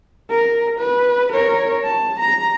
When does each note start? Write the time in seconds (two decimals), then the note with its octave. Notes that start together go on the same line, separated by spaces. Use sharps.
0.29 A#4
0.79 B4
1.32 A#4 C#5
1.84 A5
2.20 A#5